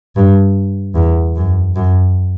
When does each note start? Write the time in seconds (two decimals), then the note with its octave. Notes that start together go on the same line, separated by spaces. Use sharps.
0.16 G2
0.95 E2
1.36 F#2
1.76 F#2